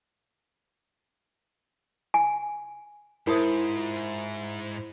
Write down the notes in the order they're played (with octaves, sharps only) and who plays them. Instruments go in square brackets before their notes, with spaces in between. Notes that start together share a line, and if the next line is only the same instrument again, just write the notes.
[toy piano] G#5
[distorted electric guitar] G#2 [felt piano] E4 C5 [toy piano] A#4 A5 D#6
[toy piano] F4